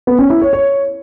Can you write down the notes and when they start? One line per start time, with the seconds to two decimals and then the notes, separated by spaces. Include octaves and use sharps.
0.07 B3
0.19 C#4
0.30 E4
0.42 C#5
0.53 C#5